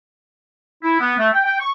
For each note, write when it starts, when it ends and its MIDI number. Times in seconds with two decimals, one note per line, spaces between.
0.83 0.97 64
0.99 1.13 59
1.17 1.28 57
1.33 1.44 79
1.45 1.55 79
1.59 1.71 85